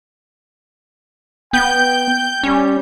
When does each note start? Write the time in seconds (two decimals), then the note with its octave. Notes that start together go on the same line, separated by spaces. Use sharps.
1.53 B3 G5 G6
2.43 G3 C#4